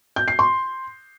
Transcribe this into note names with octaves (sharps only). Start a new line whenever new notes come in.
G6
C7
C6